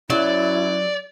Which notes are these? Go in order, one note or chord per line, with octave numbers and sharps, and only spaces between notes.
F#2 F#3 E4 D5